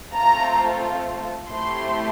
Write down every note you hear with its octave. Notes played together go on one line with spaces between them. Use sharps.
A3 C4 F4 A4 A#5
A3 C4 E4 G4 C6